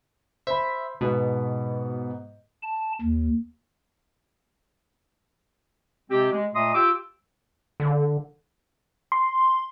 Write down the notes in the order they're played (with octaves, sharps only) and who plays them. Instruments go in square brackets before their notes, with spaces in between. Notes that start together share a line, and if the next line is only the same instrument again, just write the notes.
[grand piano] C5 B5 [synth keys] E5
[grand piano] G#2 B3 [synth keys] B2
[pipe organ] A5
D#2
[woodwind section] C3 G#3 C4 G4
G#3
A#2 A3 D#5 C6 D#6
F4 G4 G5 D6 E6
[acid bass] D3
[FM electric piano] C6